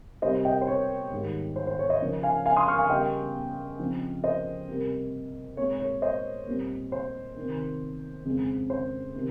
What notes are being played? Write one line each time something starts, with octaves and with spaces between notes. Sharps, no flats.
C3 G3 A#3 C5 D#5
D#5 G5
C5
C#5
G#2 D#3 G3
C5
C5
C#5
C5 D#5
C#3 F3 A#3
F5 G#5
F5 G#5
C6 D#6
C#6 F6
F5 G#5
C#3 G3 A#3 D#5 G5
C#3 F3 C4
C5 D#5
C3 G3 A#3
A#2 G#3 C4 C#5
C#5
C5 D#5
A#2 G3 C4
C5
C3 D#3 A#3
F2 C#3 G#3 C4
C5
C3 D#3 A#3